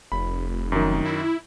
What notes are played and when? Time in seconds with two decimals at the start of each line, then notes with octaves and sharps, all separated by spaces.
0.12 F1 B5
0.72 F#2 D#3
1.05 E4